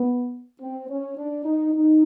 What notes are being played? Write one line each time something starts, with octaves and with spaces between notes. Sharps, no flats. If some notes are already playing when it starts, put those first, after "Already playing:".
Already playing: B3
C4
C#4
D4
D#4
D#4